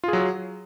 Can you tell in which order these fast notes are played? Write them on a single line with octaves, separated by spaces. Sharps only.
F4 G#4 F#3